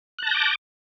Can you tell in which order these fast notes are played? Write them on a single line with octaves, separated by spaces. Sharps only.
F#6 A5 A#6 G6 D6